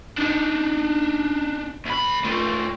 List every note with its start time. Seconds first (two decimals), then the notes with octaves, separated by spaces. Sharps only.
0.19 D4 D#4
1.86 D2 B5
2.25 A3 F4